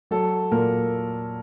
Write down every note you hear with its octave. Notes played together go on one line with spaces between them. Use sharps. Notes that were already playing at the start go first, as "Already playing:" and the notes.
F#3 A4
A#2 A#4